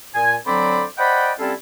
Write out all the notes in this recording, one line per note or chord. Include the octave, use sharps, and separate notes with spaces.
A#2 G#5
D3 F#3 C4 C5 D5 B5
C5 D5 D#5 F#5 G5 B5
G3 C4 C#4 E4 F4 A4